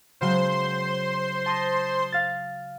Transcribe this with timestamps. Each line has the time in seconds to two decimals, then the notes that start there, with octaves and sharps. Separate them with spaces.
0.21 C#3 F#3 G#3 C5 C6
1.46 A5 D#6 A#6
2.12 F5 A6